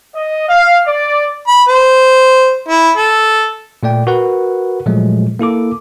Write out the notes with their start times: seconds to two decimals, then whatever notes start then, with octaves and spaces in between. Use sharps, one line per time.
0.15 D#5
0.49 F5
0.88 D5
1.48 B5
1.69 C5
2.69 E4
2.97 A4
3.83 A#2 A3 D5 G5
4.07 F#4 A#4 B4 F#5
4.86 A#2 F3 F#3 G#3 A3
5.39 A#3 E4 A4 D6